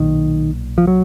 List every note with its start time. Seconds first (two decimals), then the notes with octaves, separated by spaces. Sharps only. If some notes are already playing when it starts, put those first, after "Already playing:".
Already playing: B1 A#2 D#3
0.78 F3
0.87 F#3